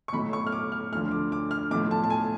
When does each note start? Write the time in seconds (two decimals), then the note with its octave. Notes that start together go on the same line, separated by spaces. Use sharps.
0.08 C#6
0.13 B1 A2 F#3 B5
0.33 C#6
0.47 F6
0.52 D6
0.72 F6
0.92 D2 D3 F3 F6
1.11 D6
1.32 D6
1.51 F6
1.71 B1 A2 F3 D6
1.91 A5
2.04 A5
2.10 G#5